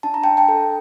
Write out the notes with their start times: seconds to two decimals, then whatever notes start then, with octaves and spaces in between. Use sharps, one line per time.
0.03 D4 A5
0.14 A#5
0.24 D4 G5 A5
0.37 G5 A5
0.49 A4